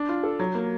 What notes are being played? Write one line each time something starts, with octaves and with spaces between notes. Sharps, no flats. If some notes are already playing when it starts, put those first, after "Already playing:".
Already playing: D4
F4
A4
F#3
A#3